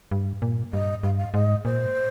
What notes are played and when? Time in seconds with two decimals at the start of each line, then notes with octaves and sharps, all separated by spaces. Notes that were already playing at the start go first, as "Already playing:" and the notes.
0.11 G2
0.42 A#2
0.73 G2 D#5
1.03 G2 F5
1.18 F5
1.34 G#2 D#5
1.65 A#2 C5